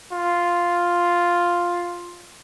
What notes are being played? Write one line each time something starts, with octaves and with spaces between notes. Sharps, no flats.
F4